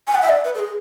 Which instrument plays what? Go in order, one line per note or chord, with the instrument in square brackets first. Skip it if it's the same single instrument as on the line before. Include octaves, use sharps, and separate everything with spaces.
[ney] G#5
F#5
E5
D5
B4
A4
G#4